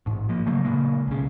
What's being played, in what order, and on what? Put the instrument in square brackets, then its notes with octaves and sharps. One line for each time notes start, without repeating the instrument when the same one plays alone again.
[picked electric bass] A1 G#2
F3 A#3
C#3 F#3 A3 A#3
A#2 C#3 G#3 A#3
B1 C#3